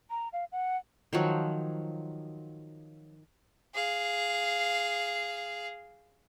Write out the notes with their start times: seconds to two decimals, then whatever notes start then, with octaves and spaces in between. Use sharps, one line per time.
0.10 A#5
0.33 F5
0.52 F#5
1.13 D#3 F3 F#3
3.75 G#4 F5